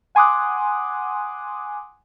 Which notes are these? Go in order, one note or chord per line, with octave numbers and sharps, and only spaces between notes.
F#5 G#5 C6 D6 D#6 F#6